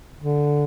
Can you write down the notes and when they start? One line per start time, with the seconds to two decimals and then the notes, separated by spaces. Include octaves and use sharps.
0.20 D3